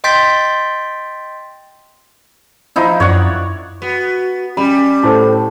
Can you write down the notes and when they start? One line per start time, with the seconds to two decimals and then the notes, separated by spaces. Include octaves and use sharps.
0.04 D#5 G5 C6 G6 A6 B6
2.76 F3 D#4 E4
3.00 F#2 C#5 D5 F#5
3.82 B3 F#4
4.57 G3 C#4 B5
5.03 A2 A4 C5 A5